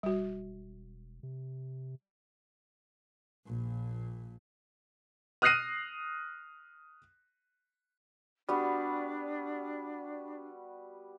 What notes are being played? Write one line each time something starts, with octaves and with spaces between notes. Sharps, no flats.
E1 G3 F#4
C3
A#1 A#2
D#6 F6 F#6 A#6 C7 D#7
G3 B3 D4 F#4